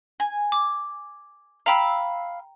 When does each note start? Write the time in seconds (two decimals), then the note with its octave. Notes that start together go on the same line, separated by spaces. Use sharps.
0.20 G#5
0.52 D6
1.66 F5 G5 A#5 B5 E6